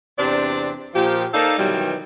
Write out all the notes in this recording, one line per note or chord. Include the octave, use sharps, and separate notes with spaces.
E2 C3 C4 D4 D5
A#2 F3 G4
A#3 D#4 A4 C5 D5 F5
B2 D#3 E3 F#3 G3